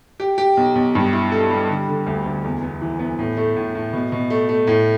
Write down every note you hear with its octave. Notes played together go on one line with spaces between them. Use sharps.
G4
G4
B1
B1
G2
E4
A4
G3
D3
D3
D2
D2
E2
B3
E3
B3
A2
A3
A2
A2
B2
B2
A3
A3
A2